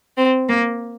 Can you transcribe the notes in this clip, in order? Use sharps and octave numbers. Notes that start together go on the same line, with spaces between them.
C4
A#3